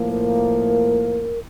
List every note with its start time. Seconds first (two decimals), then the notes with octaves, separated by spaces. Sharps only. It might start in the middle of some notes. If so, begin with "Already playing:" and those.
Already playing: A2 F3 A#3
0.09 A#4